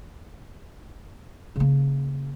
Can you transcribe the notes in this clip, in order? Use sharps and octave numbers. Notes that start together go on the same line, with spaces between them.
C#3 A#3